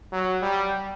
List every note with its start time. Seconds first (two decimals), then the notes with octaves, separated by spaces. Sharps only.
0.12 F#3
0.42 G3